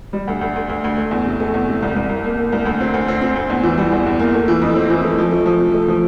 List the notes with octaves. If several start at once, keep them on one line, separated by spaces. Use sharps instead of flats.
G3
D2
D2
D2
D2
D2
A3
E2
C3
A3
E2
C3
C2
C2
C2
A#3
A#3
C2
D2
C4
D2
C4
C4
D2
E2
E3
G3
E2
E2
A#3
A3
E3
F2
C4
E3
A3
F3
A3
F3
C3
A3
F3